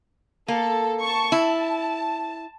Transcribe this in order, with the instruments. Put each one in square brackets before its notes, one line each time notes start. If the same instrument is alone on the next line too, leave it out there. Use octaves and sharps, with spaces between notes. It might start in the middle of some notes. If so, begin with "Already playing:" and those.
[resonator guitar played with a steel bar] A#3 [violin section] A4
[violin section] A5 C#6
[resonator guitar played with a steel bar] E4 [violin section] A5